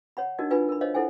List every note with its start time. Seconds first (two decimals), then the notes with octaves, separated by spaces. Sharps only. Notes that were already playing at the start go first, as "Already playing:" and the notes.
0.17 C#5 F#5 B5
0.39 D4 D#4 F#4 A#4 D#5
0.50 D4 F4 B4 G#5 B5
0.69 A#4 B5
0.81 C5 C#5 D#5 F5
0.94 E4 A4 C5 F#5 G#5